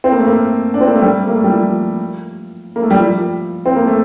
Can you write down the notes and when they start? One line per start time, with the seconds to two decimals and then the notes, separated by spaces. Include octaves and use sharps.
0.04 C4
0.12 A#3
0.19 A3
0.27 A#3
0.74 D4
0.81 C4
0.88 A#3
0.95 A3
1.02 G3
1.27 A#3
1.35 A3
1.44 G3
1.51 F3
2.76 A#3
2.83 A3
2.90 G3
2.99 F3
3.66 C4
3.76 A#3
3.87 A3